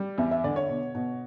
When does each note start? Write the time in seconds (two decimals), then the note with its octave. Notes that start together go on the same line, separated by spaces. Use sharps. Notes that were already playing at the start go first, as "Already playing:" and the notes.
Already playing: G3
0.18 E2 E5
0.31 E5
0.44 D3 D5
0.56 C#5
0.69 B2
0.95 B2